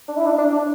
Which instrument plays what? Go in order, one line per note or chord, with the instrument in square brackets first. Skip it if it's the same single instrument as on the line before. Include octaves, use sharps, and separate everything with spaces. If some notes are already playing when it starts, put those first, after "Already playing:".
[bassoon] D4
E4
D4
D4
D4